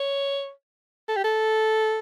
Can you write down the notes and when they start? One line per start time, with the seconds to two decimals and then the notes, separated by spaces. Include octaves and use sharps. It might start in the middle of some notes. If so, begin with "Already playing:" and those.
Already playing: C#5
1.09 A4
1.16 G4
1.24 A4